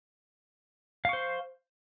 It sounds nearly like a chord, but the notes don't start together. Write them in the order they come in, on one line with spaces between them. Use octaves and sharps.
F5 C#6 C5